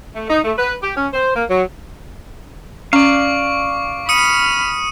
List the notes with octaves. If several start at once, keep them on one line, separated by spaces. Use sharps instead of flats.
A3
D#4
A3
B4
G4
C#4
C5
A#3
F#3
C#4 D5 F5 C#6
B5 D#6 F6 C#7 D#7